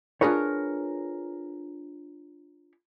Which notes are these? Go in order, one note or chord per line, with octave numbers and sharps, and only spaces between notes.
D4 F4 G#4 A#4 B4 C#5